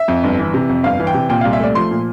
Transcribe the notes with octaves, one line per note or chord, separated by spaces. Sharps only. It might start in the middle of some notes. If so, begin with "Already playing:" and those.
Already playing: E5
F2
G1
E3
C3
F2
G1 F5
E3
G5
C3
A#2 G5
C2 F5
E5
A3 D5
F3 C6
A#2